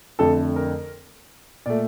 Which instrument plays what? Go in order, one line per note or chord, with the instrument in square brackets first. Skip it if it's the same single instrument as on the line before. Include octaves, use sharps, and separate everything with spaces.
[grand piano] F2 D3 A3 A4
A#4
A#2 A3 D5